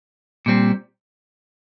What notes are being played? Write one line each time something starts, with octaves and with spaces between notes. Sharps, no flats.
A#2 G3 C4